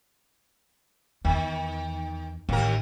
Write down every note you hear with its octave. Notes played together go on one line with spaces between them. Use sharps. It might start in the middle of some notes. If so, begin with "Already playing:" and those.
E2 D#3
A1 D#2 A#4